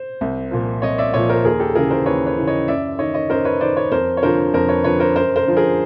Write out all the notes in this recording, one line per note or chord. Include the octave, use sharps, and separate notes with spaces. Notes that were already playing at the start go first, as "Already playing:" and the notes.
Already playing: C5
C2
A#2 F3
C2 C#5 D#5
D5 E5
A#2 F3 C#5 D#5
A#4 C5
D#2 G#4 A#4
G4 A4
C#3 E3 G#4 A#4
A#4 C5
D#2 B4 C#5
B4 C#5
C#3 E3
C#5 D#5
F#2 D5 E5
D#3 C#5 D#5
C#5 D#5
F#2 A#4 C5
B4 C#5
D#3 C5 D5
B4 C#5
F2 A#4 C5
C#5
D3 F3 A#4 C5
F2 A#4 C5
B4 C#5
D3 F3 B4 C#5
A#4 C5
F#2 A#4 C5
A#4 C5
D3 F3
G#4 A#4